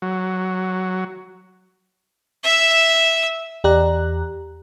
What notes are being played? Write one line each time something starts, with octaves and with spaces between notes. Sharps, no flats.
F#3
E5 E6
E2 G4 D5 A#5 F#6